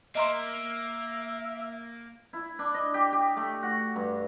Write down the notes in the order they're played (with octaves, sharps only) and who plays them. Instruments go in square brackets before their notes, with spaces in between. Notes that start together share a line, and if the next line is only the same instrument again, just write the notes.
[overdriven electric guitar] A#3 [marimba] D#5 A#5 C6 [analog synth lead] E5
[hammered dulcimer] E4
D4
D#5
G4
G4
A3
F#4
G2